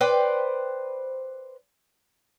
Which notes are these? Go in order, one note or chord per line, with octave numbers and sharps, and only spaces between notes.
B4 C5 D5 G5